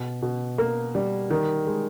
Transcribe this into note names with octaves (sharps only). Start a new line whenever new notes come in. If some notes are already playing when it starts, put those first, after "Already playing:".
Already playing: B2
B2
A#3
G3
D#3
G#3